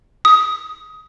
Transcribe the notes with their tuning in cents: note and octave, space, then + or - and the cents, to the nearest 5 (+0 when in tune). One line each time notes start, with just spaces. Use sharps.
D#6 +15